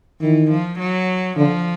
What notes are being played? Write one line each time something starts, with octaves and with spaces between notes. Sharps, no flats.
D#3 E3
F3
F#3
D3 F3